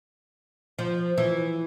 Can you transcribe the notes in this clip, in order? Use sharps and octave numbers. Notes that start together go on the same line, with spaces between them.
F3
E3